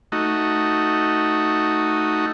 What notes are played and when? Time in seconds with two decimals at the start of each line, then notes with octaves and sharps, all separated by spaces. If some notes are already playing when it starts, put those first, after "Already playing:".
0.12 A3 D#4 F#4